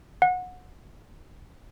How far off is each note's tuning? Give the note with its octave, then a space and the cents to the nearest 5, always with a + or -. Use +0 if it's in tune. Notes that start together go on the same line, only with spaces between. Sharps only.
F#5 -25